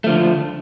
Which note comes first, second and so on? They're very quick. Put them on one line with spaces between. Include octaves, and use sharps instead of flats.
A3 F3 D3